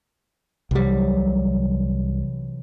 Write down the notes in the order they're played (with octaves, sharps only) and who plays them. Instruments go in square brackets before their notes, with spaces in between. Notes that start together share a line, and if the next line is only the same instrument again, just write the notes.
[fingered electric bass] C2 G3 [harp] C3 E3 F#3